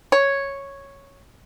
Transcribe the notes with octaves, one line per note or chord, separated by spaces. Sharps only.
C#5